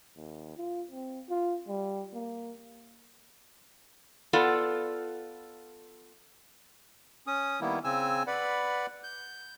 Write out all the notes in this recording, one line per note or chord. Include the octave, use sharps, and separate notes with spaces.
D#2
F4
C4
F4
G3
A#3
B3 F4 A4 D5
C#4 D#6
D#3 G3 A#3 B3 E4
C#3 C4 G#5 E6
B4 D5 F#5 B5
G6